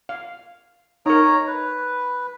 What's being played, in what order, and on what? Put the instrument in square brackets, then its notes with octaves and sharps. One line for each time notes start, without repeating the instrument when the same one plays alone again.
[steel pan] F5
[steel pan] D#4 A#4 [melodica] C#5 A#5
[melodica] B4